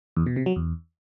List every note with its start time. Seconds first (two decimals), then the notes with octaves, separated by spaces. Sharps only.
0.17 E2
0.26 B2
0.36 C3
0.46 F#3
0.56 E2